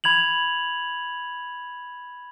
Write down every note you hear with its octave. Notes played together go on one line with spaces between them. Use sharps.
B5 G#6 F7 F#7